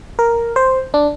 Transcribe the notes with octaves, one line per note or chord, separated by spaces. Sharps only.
A#4
C5
D4